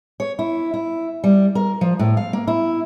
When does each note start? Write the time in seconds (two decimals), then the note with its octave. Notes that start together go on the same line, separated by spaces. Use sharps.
0.20 C#5
0.39 E4
0.74 E4
1.24 G3
1.55 A#4
1.81 F3
1.99 A2
2.17 F5
2.33 A#3
2.47 E4